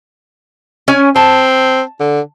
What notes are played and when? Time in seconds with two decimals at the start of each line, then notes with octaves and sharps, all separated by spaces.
0.88 C#4 G#5
1.16 C4 A5
2.00 D3